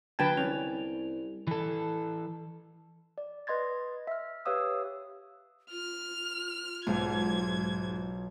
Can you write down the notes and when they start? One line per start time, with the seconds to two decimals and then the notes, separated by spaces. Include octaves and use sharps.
0.19 D3 D4 B4 G5 A5 G#6
0.37 C2 C#4 F7
1.47 E3 A4
3.18 D5
3.47 B4 D#5 C6 G#6 A6
4.07 E5 F6
4.45 G4 B4 C#5 F5 D#6 E6
5.71 F4 F6
6.87 B1 G#2 G#6